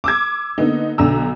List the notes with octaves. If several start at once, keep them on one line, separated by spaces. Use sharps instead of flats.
D6 E6 G#6
D3 A#3 B3 D#4
B1 D3 A#5 E6